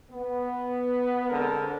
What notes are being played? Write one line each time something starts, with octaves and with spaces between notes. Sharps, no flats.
B3
D3 G#3 C4 A#4